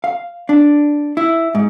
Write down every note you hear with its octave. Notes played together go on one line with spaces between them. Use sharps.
F5
D4
E4
G#2